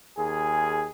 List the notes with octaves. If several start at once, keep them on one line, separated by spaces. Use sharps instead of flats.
D#2 G#4